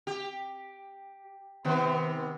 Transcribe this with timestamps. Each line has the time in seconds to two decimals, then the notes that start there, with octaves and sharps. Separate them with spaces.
0.07 G4
1.65 C3 D#3 B3